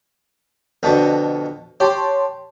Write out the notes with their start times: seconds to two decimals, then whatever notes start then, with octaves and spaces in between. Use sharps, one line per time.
0.83 F2 B2 D3
1.80 G4 C#5 A5 C6